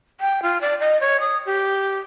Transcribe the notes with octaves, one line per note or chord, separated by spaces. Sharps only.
G5
F4
D5
D#5
C#5
D#6
G4